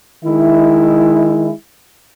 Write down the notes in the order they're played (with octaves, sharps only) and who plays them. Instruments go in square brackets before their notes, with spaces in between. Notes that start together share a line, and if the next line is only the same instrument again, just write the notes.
[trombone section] D#3 G#3 E4